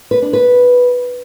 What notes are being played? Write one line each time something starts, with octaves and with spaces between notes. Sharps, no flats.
B4
D4
B4